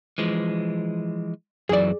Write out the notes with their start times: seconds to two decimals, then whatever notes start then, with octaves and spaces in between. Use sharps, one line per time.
0.18 E3 F3 G#3
1.69 F#2 E3 F#3 G#4 D5